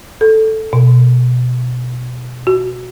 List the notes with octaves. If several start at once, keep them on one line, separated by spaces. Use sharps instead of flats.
A4
B2
F#4